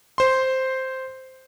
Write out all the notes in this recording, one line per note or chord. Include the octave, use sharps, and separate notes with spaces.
C5 C6